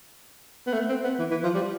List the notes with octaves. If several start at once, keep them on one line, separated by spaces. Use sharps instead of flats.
B3
A3
C4
B3
E3
E3
F3
G3